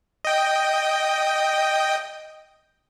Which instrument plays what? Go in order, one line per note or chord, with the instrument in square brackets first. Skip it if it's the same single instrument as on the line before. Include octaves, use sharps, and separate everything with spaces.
[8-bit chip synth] D#5 G5